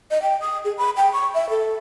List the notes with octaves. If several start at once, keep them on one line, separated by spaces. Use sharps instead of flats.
D#5
G5
D#6
G#4
B5
G5
C#6
E5
A4